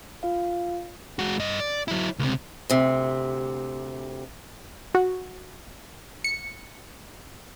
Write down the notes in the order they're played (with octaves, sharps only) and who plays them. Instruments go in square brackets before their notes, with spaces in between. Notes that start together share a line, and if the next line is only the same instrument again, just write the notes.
[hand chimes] F4 F5
[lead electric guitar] G#3 F#4
G2 D#5
D5
F#3 E4
C#2 C3
[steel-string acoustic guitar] D2 C3
[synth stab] F#4
C#7